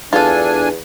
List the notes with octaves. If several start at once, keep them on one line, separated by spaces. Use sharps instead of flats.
E2 D4 F4 A4 G#5